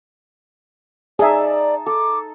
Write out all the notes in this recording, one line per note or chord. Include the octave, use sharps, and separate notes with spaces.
D#4 G#4 D5 E5 A5
A4 D6